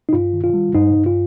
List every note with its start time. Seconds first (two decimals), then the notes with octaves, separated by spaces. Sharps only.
0.09 D#4
0.13 G2 F4
0.33 D#3
0.44 F4
0.54 G3
0.75 G2 D#4
0.96 G2
1.06 F4